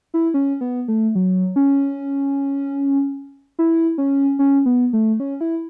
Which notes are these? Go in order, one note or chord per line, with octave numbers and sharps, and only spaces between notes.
E4
C#4
B3
A3
F#3
C#4
E4
C#4
C#4
B3
A3
C#4
E4